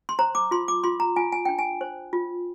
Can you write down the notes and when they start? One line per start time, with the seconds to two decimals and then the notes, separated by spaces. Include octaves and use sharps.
0.09 C6
0.19 C5 A#5
0.35 D6
0.51 F4 C6
0.68 D6
0.84 F4 C6
1.00 A#5
1.16 F4 G#5
1.32 G#5
1.45 D4 G5
1.59 G#5
1.81 C5
2.13 F4